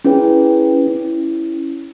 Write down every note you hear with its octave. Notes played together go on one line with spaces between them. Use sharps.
C#4 E4 G#4 B4 G5
C#4 E4